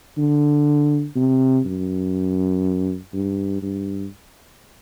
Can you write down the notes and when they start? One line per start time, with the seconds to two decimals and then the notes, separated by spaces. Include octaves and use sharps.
0.18 D3
1.16 C3
1.65 F#2
3.13 G2
3.62 G2